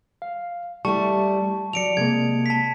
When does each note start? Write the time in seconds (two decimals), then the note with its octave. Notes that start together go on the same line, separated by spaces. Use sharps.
0.22 F5
0.85 G3 A3 E4 A5 C#6
1.73 F#3 D5 C#7 D7 F7
1.97 C3 G#3 A#3 G#6
2.46 A5 B6